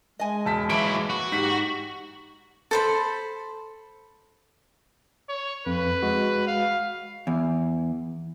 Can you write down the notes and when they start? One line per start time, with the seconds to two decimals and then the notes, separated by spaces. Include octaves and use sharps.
0.19 G#3 D#5 G#5
0.45 E1 A5 B6
0.70 E3 F#3 A#3 E4 B5 D7
1.10 F#4
1.32 G#2 G4 B6
2.71 A4 C5 B5
5.29 C#5
5.66 F2 B4
6.02 G#3 F#4
6.47 F5
7.27 E2